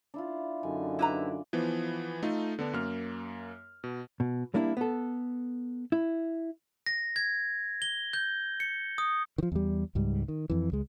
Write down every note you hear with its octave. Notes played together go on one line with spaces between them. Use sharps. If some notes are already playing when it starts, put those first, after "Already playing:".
D4 E4 F4
F#2 D3 D#4 G#5
D4 E4 B4 D5 A#5
E3 F3 B3
A3 D#4 F4 A4
D3 B3 D4
F#2 A#3 F6
B2
B2
G3 A#3 D4 E4
B3 A4
E4
A#6
G#6
G7
G6
C#7
D#6
D#3 F3
E2 G3
C#2 G#2 G3
D#3
F2 E3
C#2 G#3